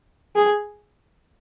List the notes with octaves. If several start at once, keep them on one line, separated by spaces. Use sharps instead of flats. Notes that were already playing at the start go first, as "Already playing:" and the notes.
G#4